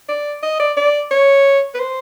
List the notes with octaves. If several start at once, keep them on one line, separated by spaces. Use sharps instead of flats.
D5
D#5
D5
D5
C#5
B4
C5